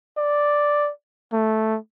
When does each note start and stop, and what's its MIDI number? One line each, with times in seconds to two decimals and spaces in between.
0.18 0.90 74
1.33 1.77 57